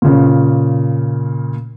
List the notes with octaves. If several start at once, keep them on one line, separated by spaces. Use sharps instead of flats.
A#2 C#3